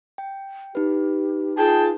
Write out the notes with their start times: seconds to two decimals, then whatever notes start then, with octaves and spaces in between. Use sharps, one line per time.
0.18 G5
0.75 D#4 G4 B4
1.58 F4 G#4 G5 A5